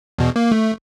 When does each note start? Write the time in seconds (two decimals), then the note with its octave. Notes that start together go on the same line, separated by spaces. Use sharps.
0.18 E2 B2
0.36 A#3
0.52 A3